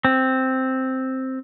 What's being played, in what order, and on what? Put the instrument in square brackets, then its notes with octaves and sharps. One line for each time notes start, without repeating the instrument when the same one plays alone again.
[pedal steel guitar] C4